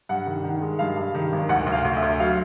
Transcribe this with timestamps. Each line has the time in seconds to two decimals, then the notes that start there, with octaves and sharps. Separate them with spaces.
0.09 G2 F#5
0.26 D#3
0.44 D#3
0.62 G#3
0.79 G2 F5
0.97 G2
1.15 D#3
1.32 G#1
1.49 D2 F#5
1.66 D2
1.72 F5
1.85 D2
1.97 E5
2.02 D2
2.20 F#3 F5